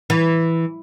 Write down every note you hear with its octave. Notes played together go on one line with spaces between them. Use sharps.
E3